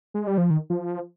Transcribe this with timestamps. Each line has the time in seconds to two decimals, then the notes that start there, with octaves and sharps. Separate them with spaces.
0.14 G#3
0.27 G3
0.38 F3
0.50 D#3
0.70 F3